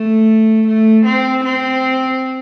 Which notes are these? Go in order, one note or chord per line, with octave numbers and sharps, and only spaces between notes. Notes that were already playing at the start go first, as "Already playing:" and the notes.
Already playing: A3
A3
C4
C4